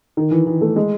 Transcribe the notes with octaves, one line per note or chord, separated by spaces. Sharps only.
D#3
E3
E3
A3
G#3